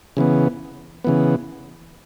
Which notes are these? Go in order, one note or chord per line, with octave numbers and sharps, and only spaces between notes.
C#3 E3 B3
C#3 E3 B3